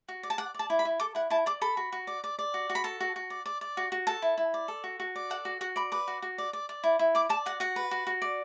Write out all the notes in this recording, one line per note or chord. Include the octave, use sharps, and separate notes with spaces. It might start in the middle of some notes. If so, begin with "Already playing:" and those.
F#4
D5
A5
D5 F#5
D5 A5
E4
B5
E4
A4 D6
E4 F#5
E4 A5
D5 D6
A4 B5
F#4
F#4
D5
D5
D5
F#4
F#4
B5
A4 A5
F#4
F#4
D5
D5
D5
F#4
F#4
A4 A5
E4
E4
D5
A4
F#4
F#4
D5
A4 F#5
F#4
F#4 F#5
D5 B5
B4 D6
F#4
F#4
D5
D5
D5
E4
E4
D5 D6
D5 A5
F#4 F#5
F#4 F#5
B4
F#4
F#4
D5